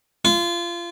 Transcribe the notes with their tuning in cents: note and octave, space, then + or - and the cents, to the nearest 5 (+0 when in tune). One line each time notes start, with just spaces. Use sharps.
F4 -25